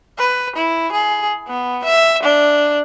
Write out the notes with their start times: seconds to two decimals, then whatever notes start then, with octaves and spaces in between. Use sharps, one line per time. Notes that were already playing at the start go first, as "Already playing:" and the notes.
0.18 B4
0.55 E4
0.92 G#4
1.48 B3
1.84 E5
2.23 D4